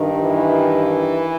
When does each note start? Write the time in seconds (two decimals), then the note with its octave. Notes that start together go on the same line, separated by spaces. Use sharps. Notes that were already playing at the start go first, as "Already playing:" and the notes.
Already playing: G2 D#3
0.21 E3